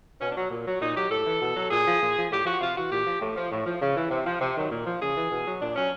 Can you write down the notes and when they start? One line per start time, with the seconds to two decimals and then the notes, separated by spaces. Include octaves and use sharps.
0.21 B2 C#4
0.31 D4
0.36 F#3
0.51 A#2
0.66 F#3
0.81 A#2 D#4
0.96 F#3 G4
1.10 A2 A4
1.26 E3
1.41 B2
1.56 F#3
1.71 A#2 G#4
1.86 F3
2.01 A#2
2.17 F3
2.31 A2 G4
2.45 F3 F#4
2.60 C3 F4
2.76 E3 F#4
2.91 A#2 G4
3.06 F3
3.21 A2
3.36 F3
3.51 A2
3.65 F3
3.81 C#3
3.96 E3
4.11 C3
4.26 F3
4.41 C3
4.55 D#3 F#3
4.71 A#2
4.86 F3
5.01 C#3 G#4
5.16 E3
5.30 B2
5.46 F#3
5.60 A#2 D4
5.75 F#3 C#4